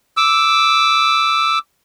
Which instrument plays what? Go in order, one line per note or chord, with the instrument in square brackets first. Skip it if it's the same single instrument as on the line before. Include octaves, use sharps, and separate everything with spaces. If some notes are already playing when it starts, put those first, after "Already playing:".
[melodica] D6 E6